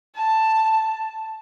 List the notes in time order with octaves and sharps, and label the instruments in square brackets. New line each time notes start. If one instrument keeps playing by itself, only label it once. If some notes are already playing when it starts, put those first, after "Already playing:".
[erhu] A5